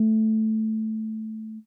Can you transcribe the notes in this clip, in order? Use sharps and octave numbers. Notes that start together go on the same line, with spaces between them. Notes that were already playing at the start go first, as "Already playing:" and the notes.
Already playing: A3